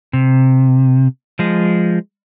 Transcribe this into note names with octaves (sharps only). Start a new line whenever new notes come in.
C3
F3 G#3